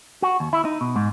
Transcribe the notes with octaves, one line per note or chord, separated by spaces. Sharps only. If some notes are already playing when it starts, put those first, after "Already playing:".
F#4
D#2
E4
D#4
B2
G#2